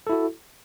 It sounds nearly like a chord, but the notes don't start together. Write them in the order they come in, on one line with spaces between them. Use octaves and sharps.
A4 E4 F#4